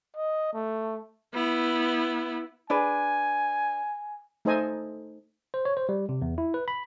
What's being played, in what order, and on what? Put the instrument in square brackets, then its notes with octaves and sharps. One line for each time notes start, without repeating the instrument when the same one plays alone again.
[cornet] D#5
A3
[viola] B3 E4
[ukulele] D4 G#4 B4 [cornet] G#5
[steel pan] A3 D#4 A4 C5 D#5 G#5
[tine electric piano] C5
C#5
C5
G3
C3
E2
E4
B4
B5